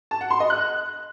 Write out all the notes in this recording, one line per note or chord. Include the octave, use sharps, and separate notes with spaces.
A5
F#5
C6
D#5
F#6